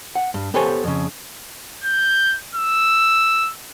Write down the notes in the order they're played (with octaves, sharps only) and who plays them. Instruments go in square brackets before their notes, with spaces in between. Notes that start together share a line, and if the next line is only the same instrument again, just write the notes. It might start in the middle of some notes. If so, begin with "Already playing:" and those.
[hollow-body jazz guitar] F#5
G2
B3 G4 A4 C5 C#5 G#5
F2 C#3
[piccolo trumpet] G6
E6